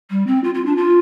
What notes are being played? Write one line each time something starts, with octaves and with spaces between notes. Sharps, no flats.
G3
C4
F4
F4
D4
F4